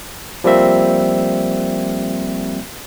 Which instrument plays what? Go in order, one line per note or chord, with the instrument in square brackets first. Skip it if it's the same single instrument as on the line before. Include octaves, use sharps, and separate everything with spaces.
[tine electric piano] F3 G3 A#3 C4 E5